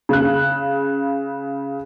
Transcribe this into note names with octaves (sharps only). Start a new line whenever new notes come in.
C#3 F#6